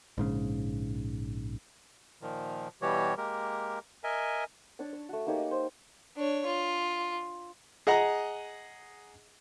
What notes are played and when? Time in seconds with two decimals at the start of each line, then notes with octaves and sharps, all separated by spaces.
0.18 A#1 G#2 C#3
2.22 A#2 D#3 F3
2.82 B2 E3 G3 F#4 G4 C#5
3.17 G#3 A#3 G4 A#4
4.04 A#4 D#5 E5 G#5
4.79 D4 C#5 A5
4.93 C#5
5.09 A3 F#4
5.26 A#3 D#4 G4 C#5
5.38 D#5
5.51 C5
6.16 D4 C#5
6.47 F4
7.87 G#4 D#5 F#5 A#5